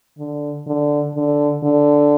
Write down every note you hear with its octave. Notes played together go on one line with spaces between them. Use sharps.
D3
D3
D3
D3